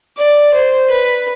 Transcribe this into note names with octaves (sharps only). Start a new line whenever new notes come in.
D5
C5
B4